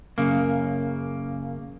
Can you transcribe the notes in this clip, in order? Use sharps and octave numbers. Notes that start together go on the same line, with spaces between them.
F#2 C#3 A#3